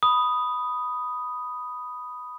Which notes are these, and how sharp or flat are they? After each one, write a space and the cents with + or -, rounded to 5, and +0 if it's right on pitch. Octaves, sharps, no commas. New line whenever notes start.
B5 +0 D#6 +0